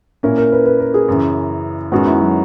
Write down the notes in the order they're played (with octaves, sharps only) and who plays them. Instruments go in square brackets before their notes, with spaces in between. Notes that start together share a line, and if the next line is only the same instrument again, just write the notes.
[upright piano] A#2 A#3 C#4 E4 [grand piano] A#4
[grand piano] A#4
B4
B4
A#4
G#4
[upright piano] F#2 C#3 E3
[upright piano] F#2 D#3 G#3 B3 [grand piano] F#4
[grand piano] E4
F#3